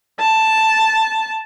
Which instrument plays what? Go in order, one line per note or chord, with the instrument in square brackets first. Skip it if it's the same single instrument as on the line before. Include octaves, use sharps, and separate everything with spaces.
[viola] A5